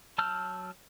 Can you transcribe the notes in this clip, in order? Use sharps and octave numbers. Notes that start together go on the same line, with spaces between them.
F#3 A5 E6 F6 G6